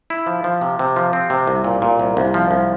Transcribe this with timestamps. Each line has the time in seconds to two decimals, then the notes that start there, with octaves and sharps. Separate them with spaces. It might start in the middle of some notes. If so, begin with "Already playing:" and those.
0.10 E4
0.27 F3
0.44 F3
0.61 C3
0.79 C3
0.96 F3
1.13 C4
1.30 C3
1.48 C2
1.64 A#2
1.82 A#2
2.00 C2
2.17 C2
2.34 F3
2.51 C2